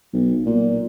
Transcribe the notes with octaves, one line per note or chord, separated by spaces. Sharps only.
B1
A#2